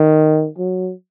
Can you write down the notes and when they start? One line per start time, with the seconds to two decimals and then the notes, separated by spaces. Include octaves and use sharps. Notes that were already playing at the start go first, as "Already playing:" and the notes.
Already playing: D#3
0.58 F#3